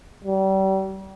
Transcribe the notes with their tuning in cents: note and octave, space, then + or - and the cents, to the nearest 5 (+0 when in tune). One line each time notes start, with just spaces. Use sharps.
G3 -35